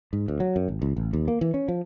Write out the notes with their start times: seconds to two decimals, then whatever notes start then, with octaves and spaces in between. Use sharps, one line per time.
0.13 G#2
0.28 D2
0.40 F#3
0.56 F#2
0.68 G#1
0.82 C#2
0.97 A1
1.13 D#2
1.28 A#3
1.41 E3
1.54 C#4
1.68 F3